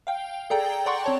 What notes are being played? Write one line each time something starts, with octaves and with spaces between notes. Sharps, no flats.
F5 G5
G#4 A4 D5 G5 A#5
D5 F#5 G5 A#5 C6 C#6
C4 C#5 A5